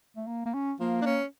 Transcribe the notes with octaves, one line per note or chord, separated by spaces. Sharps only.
A3
A#3
A#3
C#4
F3 A#3
D4
C#4